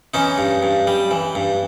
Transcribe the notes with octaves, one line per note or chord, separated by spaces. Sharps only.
E3 C#4 D#4
G2
G2
G3
E3
G2